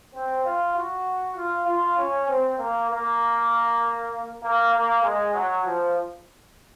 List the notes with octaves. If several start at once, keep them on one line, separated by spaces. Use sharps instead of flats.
C4
F4
F#4
F4
F4
C#4
C4
A#3
A#3
A#3
A#3
G#3
F#3
F3